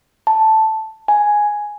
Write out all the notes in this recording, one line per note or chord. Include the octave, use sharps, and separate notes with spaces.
A5
G#5